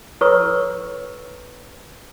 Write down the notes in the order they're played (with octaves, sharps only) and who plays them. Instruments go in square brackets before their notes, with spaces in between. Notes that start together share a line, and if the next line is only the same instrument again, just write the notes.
[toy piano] E4 A4 B4 C#5 C#6 E6